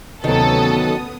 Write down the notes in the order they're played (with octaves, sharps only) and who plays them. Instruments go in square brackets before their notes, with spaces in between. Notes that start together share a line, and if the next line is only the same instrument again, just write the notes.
[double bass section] D2 C3 C#4 [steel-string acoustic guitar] D#3 F#3 [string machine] B3 D#6 [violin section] A4